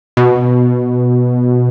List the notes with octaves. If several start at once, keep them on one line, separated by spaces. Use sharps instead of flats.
B2